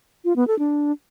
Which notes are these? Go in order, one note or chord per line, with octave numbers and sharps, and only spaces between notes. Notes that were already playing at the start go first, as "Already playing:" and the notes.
F4
B3
A4
D4